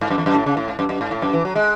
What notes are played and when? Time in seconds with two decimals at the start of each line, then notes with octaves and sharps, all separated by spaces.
0.01 G#2
0.10 F#2
0.18 E2
0.26 F#2
0.35 A2
0.46 C#3
0.57 A2
0.68 G#2
0.79 F#2
0.89 F#2
1.01 G#2
1.11 A2
1.22 F#2
1.33 E3
1.45 F#3
1.55 G#3